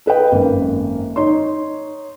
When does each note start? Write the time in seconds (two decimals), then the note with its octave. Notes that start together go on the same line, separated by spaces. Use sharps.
0.06 A4 B4 D#5 G5
0.32 G#1 F#2 A#3
1.16 D#4 C#5 C6